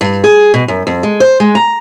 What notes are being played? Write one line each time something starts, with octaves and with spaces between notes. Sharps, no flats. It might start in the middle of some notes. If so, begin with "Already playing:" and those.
G2
G#4
B2
F#2
F2
G#3
C5
G#3
A#5